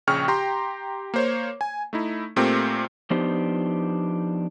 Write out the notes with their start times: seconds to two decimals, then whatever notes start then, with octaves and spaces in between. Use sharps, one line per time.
0.07 A#1 C#3 G#4 G5 C#6 F6
0.28 G4 G5 A#5 C6
1.14 A#3 C5 C#5
1.61 G#5
1.93 A3 D#4 E4
2.36 A#2 A3 C4 G4 A#4
3.10 F3 B3 D4 D#4 G4 C5